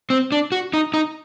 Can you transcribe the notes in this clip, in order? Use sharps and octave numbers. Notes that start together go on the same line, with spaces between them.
C4
D4
F#4
D#4
D#4